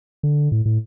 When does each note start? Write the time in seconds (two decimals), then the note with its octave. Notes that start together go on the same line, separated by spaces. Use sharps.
0.23 D3
0.52 A2
0.65 A2